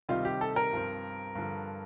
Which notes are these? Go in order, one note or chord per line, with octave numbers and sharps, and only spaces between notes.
C3 D#3 G3 C4 D#4 F4
G4
A4
A#4
G2 F3 C4
G2 D3 F3